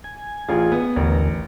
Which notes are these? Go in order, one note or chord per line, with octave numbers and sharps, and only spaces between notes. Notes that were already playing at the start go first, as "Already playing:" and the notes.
G#5
A1 F4 G#4
B3
A1 D#2 D3 A#4